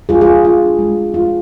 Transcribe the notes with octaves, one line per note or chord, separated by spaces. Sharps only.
G#3 F4 G#4
F4 G#4
G#3
G#3 F4
D4
G#3
G#3
G#3 F4